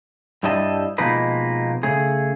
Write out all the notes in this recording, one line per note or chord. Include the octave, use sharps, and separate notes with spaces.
G2 G3 E4 C5 D#5 A5
B2 F3 G#3 A#3 D#4 B4
C#3 A3 G#4